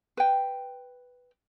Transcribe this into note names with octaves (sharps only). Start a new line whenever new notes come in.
B4 G5